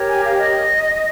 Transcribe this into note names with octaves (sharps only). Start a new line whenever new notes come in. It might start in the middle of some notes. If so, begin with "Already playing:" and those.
Already playing: G4 A#4 C#5
G#5
F5
D#5